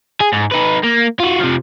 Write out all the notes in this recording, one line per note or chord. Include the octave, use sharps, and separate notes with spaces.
G#4
G#2
D#4 B4
A#3
F4 F#4
C3 F3